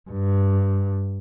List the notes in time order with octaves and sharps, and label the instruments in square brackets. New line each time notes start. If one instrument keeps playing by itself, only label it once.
[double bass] G2